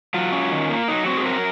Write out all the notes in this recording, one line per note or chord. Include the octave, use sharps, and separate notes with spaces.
F#3 F4
C#4
D#3
A#3
F#3 D#4
C4 F#4
G#4
F#3 A#4